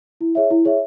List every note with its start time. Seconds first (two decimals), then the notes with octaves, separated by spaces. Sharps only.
0.21 E4
0.35 G#4 C#5 E5
0.51 E4
0.65 G#4 C#5 E5